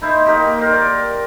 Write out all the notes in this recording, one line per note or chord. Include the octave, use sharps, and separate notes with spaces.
D#4 E4 C5
A#3 D#4 G4
A#4 C5
D5